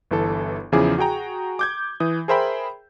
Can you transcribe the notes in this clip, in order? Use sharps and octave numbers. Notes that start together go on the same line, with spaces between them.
G1 E3 A4
E2 C#3 F3 E4 G#4 D6
F#4 G#4 G5 A#5
D6 G6 G#6
E3 D#6
G#4 A#4 C5 E5 G5 B5